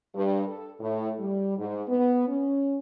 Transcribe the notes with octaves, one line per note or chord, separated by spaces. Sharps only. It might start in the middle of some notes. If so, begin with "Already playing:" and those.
G2
A4
A2
G3
G#2
B3
C#4